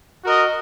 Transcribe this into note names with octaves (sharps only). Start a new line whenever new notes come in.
F#4 A#4 D#5